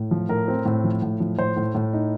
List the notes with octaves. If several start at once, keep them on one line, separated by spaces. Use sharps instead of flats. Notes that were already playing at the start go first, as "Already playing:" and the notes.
Already playing: A2
F3
A2 A#4
C4
A2
F3
A2
F3
A2 C5
A2
A2
D#4